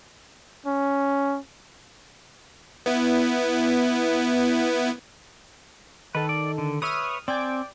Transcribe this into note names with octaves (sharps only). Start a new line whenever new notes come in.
C#4
B3 E4
D#3 A4 B4
D5
D3
B4 C#5 E5 D#6 F6
C4 D5 G5 G#5 D6